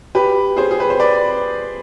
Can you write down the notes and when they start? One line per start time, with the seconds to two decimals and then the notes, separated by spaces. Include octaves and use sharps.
0.15 G4 B4
0.57 G#4 C5
0.71 G#4
0.80 B4
0.90 C5
1.00 B4 D5